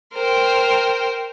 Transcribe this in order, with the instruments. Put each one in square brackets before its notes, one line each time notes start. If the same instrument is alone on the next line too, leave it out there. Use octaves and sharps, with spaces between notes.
[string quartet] A#4 C5 G5